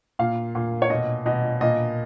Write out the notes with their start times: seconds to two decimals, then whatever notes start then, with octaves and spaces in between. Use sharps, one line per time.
0.19 A#2 F5
0.55 A#2
0.82 C#5
0.90 B2 D#5
1.26 B2 D#5
1.61 A#2 D#5